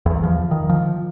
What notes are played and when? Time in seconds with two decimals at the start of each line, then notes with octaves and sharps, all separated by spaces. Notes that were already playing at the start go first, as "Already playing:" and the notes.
0.06 E2
0.24 F3
0.51 D#3
0.70 F3